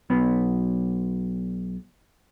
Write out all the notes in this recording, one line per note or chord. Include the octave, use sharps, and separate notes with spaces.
B1 B3